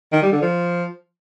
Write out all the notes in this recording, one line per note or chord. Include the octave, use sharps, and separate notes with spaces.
D#3
G3
D3
F3